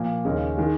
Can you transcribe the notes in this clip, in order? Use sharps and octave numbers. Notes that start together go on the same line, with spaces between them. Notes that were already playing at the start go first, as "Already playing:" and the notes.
Already playing: A#2 F3 A#3
D#2 C#3 G#3 C#4
D#3 G#3